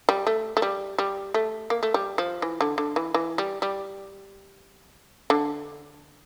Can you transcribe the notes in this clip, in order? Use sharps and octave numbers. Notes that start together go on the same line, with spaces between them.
G3
A3
A3
G3
G3
A3
A#3
A3
G3
F3
E3
D3
D3
E3
E3
G3
G3
D3